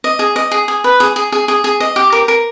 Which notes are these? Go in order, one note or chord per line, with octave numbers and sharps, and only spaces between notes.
D#5
G#4
D#5
G#4
G#4
B4
G#4
G#4
G#4
G#4
G#4
D#5
G4
A#4
A#4